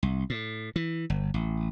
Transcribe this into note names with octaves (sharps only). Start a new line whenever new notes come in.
C2
A2
E3
G1
A1